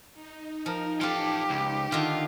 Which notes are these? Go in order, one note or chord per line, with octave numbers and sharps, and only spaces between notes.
D#4
F3 A#4
E3 F4 G4 A4 F5
C#2
D3 D#3 F4